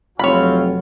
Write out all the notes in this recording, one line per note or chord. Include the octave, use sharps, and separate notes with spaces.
F1 F#3 C4 C#4 F4 C#5 B5